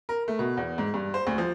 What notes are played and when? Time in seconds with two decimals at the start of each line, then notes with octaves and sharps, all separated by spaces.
0.09 A#4
0.28 A3
0.39 B2
0.57 E2
0.78 G#2
0.94 G2
1.14 C5
1.27 D2
1.38 F3